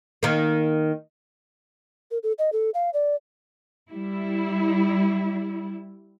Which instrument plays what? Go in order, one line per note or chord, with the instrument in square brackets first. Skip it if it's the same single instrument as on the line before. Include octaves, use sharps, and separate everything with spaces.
[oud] D#3 A#3
[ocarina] A#4
A4
D#5
A4
F5
D5
[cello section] G3 E4